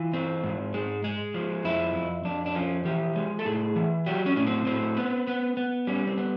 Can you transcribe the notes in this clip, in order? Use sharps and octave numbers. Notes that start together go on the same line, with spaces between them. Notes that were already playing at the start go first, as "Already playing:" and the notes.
Already playing: E3 F4
C4
G#2
G#3
G#3
F3
F2 E4
F2
F2 D4
D4
F3 C#4
E3 G4
G#3
A4
A2 G#4
E3
F#3 G4
C#4
A2 C#4
C4
A2 C4
B3
B3
B3
G3 C#4
C4
B3